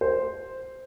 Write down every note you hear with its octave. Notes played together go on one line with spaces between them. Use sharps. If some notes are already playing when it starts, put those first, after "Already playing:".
C5